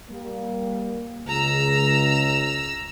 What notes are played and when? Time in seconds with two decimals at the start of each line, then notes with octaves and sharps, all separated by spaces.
0.11 G3 A#3
1.27 C#2 A#5 E6